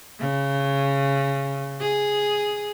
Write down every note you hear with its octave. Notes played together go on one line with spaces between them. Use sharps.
C#3
G#4